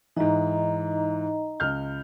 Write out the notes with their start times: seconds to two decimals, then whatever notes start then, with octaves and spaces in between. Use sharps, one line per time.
0.16 G#2 E3 D#4 D#5 A#5
1.60 C#2 F6 G6